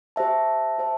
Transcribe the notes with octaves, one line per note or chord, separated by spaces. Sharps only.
G4 C5 E5 A5
G4 C5 E5 A5